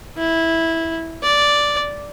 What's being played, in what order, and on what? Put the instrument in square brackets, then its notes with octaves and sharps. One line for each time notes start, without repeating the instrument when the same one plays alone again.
[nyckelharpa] E4
D5